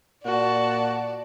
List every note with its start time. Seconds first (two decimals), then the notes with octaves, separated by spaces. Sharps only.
0.25 A#2 F#4 D5 A5